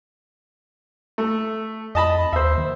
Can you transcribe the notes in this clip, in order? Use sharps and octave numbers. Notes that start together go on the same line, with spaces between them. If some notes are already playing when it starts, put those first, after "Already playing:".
A3
F2 D#5 A5 B5
D#2 C5 E5
D#3